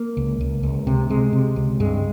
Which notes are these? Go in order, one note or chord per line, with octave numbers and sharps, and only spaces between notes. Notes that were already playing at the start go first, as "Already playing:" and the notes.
Already playing: A#3
C#2
C#2
C#2
C3
C3 G#3
C3
C#2
G2 G#3